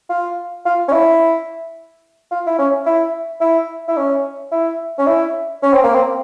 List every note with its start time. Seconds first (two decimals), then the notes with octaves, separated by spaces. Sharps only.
0.10 F4
0.65 F4
0.88 C#4
0.92 E4
2.31 F4
2.46 E4
2.59 C#4
2.86 E4
3.41 E4
3.88 E4
3.97 C#4
4.51 E4
4.98 C#4
5.07 E4
5.63 C#4
5.74 C4
5.84 A#3
5.94 C4